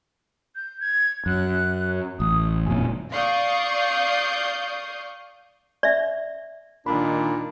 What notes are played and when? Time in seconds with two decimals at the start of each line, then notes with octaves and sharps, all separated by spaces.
0.56 G6
0.81 G#6
1.26 F#2 F#6
2.20 A1 D#6
2.66 F#1 F2 A#2 G#5
3.12 D5 F5 C#6 D#6 G6 C7
5.83 D5 E5
6.86 A#2 D#3 D4 D#4 B5